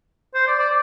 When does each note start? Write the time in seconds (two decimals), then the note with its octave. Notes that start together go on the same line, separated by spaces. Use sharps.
0.35 C5
0.48 D5
0.60 D5